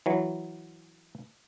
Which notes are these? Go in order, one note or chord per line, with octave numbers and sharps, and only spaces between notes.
E3 F#3